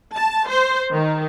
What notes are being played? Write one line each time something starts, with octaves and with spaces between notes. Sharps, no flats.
A5
C5
D#3